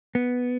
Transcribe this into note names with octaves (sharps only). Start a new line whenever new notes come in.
B3